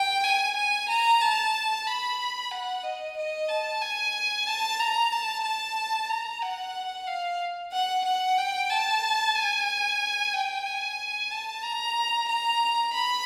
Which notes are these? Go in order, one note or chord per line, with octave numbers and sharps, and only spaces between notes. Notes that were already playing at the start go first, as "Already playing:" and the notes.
Already playing: G5
G#5
G#5
A#5
A5
B5
F#5
D#5
D#5
A5
G#5
A5
A#5
A5
A5
A#5
F#5
F5
F#5
F#5
G5
A5
G#5
G5
G#5
A5
A#5
A#5
B5